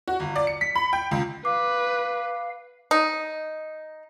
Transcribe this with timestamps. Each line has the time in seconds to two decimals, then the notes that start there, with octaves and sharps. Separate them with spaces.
0.08 F#4
0.20 G1
0.36 D5
0.47 C#7
0.61 B6
0.75 B5
0.93 G5
1.11 C#2
1.45 B4 F5 D6
2.91 D#4